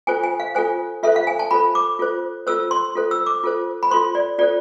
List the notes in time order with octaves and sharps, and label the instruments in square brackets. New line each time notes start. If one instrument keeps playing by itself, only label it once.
[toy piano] F4 A4 C5 G#5
G#5
F5
F4 A4 C5 G#5
F4 A4 C5 E5
F5
G#5
A5
F4 A4 C5 B5
D6
F4 A4 C5
F4 A4 C5 E6
C6
F4 A4 C5
E6
D6
F4 A4 C5
B5
F4 A4 C5 C6
D5
F4 A4 C5 D5